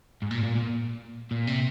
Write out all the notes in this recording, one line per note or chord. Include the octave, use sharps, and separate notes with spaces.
G#2
A#2
A#2
A#2
A#2
C3